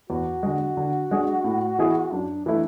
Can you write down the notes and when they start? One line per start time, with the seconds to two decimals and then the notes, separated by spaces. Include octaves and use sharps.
0.10 E2 F#4
0.43 D3 G#3 F#4
0.77 D3
1.11 G#3 D4 G#4
1.44 A2
1.79 E3 B3 E4 G#4
2.12 F#2 D4
2.45 E3 A3 D4 E4